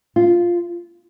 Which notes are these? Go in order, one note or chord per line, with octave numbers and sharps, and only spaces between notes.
F4